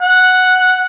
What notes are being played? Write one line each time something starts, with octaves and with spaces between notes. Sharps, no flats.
F#5